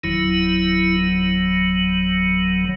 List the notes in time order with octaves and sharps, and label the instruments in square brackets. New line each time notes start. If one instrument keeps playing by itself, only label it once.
[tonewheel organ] F#1 E2 D#3 F#3 E4